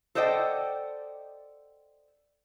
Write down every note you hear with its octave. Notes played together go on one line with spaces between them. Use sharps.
A4 C5 D5 D#5 F#5 G5